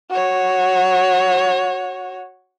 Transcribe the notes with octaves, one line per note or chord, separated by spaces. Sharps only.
F#4 C#5